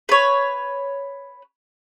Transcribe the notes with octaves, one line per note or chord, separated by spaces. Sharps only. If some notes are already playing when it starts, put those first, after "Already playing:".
B4 C#5